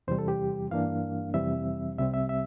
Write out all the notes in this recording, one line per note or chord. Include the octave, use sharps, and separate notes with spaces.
E2 C3 E3 G3 C5
A4
G4
G2 E3 A#3 D4 F5
F2 C3 E3 G3 C4 E5
C2 C3 G3 C4 E5
E5
E5